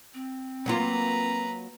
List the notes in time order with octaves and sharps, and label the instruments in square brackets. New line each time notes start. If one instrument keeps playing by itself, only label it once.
[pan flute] C4
[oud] F#3 A#3 F4 [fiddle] B4 A#5